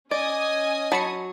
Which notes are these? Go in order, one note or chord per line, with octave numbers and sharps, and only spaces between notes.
C#4 D5 D#5 G#5 D#6
F#3 A5 B5 C#7